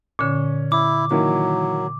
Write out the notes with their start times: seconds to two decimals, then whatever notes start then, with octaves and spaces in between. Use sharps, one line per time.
0.19 A#2 D3 C#4
0.72 E4 D6
1.11 D#3 E3 F#3 A#3